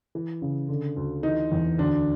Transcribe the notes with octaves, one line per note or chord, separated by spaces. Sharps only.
E3
C#3
D3
D2
E3 D#4
E2
D2 D4